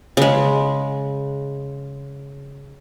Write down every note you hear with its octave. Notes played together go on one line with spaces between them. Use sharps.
C#3 G#3